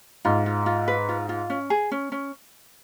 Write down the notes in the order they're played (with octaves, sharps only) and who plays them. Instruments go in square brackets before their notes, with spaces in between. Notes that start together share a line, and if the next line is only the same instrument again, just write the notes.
[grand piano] G#2 [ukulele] F4
[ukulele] F4
F4
B4
F4
F4
C#4
G#4
C#4
C#4